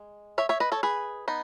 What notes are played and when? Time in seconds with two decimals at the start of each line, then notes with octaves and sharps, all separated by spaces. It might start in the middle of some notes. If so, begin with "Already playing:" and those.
Already playing: G#3
0.38 C#5 E5
0.49 C#5 E5
0.60 B4 D#5
0.72 A4 C#5
0.83 G#4 B4
1.28 B3 D#4